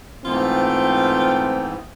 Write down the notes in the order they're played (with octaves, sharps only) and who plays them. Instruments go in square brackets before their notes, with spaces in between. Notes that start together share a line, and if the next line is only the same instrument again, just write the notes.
[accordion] G#2 E3 B3 [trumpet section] A3 G5 [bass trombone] C4 [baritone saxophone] F4